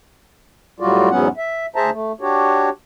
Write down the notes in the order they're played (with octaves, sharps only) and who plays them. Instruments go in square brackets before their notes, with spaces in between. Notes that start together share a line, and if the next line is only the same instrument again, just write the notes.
[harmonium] A2 F#3 G3 F4 F#4 D5
E2 G#2 F#3 B3 C#4 F#5
E5
D2 G#4 C5 E5 A5 A#5
A3
D4 F#4 G4 C#5